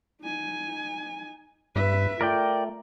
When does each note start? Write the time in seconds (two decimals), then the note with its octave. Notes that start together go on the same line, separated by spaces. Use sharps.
0.22 D#4 G#5
1.76 G2 B4 E5
2.21 A3 F4 A#4 D5 G5